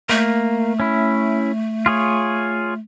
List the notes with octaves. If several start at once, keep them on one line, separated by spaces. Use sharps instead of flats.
A3 A#3
C#4 E4
F4 G#4 C#5